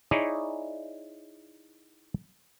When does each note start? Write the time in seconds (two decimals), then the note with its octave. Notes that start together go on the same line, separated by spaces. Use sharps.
0.11 D#4 E4 G#4 C#5 D5